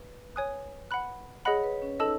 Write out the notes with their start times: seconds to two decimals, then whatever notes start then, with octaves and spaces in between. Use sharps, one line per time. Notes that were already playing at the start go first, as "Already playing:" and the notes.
Already playing: B4
0.36 C#5 G#5 D#6 F#6
0.91 F#5 B5 F#6
1.45 G#4 C#5 D#5 F#5 B5 F#6
1.64 B4
1.82 C#4
1.99 D#4 A4 D#5 A5 E6